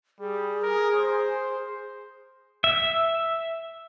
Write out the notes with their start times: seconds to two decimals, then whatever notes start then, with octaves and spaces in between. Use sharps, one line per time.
0.20 G3 G#4
0.63 A#4
0.95 C5
2.64 E5